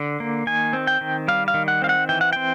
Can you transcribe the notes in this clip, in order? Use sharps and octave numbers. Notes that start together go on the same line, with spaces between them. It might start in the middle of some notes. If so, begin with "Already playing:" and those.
Already playing: D3
A#3
D#3 G#5
C4
G5
D#3
G3 F5
F5
D#3
F#5
C4 F5
F#5
E3 G5
F#5
C4 G5